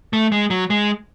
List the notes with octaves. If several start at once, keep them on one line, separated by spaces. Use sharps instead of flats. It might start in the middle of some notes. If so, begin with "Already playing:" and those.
A3
G#3
F#3
G#3